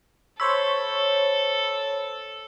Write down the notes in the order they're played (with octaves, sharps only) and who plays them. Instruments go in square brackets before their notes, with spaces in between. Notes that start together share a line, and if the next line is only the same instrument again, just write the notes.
[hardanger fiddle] A4 [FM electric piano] C5 C#5 B5 [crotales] E6